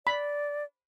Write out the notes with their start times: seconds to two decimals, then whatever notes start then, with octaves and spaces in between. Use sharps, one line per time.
0.07 D5 B5